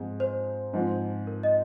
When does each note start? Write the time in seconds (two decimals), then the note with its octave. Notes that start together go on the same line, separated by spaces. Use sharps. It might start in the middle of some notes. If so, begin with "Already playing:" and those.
Already playing: G#2 F3 C4 D#4 G#4
0.20 C5
0.73 G#2 F3 C4
1.27 A#4
1.43 D#5